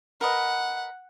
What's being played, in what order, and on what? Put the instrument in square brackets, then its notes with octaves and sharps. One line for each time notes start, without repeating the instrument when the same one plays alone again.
[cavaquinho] A#4 B4 D#5 [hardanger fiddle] F#5